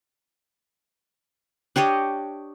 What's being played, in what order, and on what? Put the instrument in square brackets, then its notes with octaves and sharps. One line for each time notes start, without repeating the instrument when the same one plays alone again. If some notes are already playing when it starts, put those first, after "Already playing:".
[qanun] D4 G4 C#5 D#5